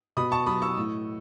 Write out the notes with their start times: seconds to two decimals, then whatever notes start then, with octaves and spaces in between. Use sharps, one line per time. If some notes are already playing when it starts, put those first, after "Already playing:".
0.17 B2 B5 D#6
0.32 A5 C#6
0.46 F#3 B5 D#6
0.62 C#6 E6
0.77 A2